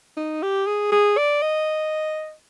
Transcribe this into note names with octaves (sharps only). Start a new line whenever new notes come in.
D#4
G4
G#4
G#4
D5
D#5